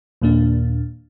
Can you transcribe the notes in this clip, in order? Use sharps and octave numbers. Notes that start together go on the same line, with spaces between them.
D#2 A#2 A#3 D4